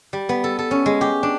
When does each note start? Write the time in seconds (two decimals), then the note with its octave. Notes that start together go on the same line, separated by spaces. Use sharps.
0.13 G3
0.29 B3
0.44 A4
0.59 A4
0.71 C#4
0.86 G#3
1.01 G4
1.23 D4